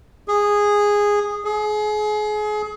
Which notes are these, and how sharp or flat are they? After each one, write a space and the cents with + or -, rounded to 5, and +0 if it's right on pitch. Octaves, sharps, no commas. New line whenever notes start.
G#4 -10
G#4 +30